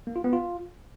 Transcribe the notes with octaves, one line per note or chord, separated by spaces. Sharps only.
A#3
F4
B3
F4